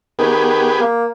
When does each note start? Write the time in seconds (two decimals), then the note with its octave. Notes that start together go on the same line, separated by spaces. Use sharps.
0.19 D#3 B3 G4 G#4
0.80 A#3